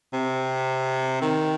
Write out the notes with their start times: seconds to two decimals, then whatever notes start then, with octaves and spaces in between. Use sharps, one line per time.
0.13 C3
1.22 D#3